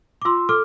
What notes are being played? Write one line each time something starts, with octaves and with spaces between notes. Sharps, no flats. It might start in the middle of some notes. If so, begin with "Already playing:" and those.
D6
F4 C6 E6
A4 D6 F6